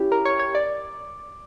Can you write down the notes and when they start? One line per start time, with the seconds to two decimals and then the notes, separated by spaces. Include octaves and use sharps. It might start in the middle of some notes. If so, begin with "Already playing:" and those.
Already playing: C#4 E4 G4
0.12 A#4
0.25 C#5
0.39 C#5
0.55 D5